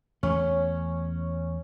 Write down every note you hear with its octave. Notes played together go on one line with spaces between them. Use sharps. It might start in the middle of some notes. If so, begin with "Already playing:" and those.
E2 A3 C#4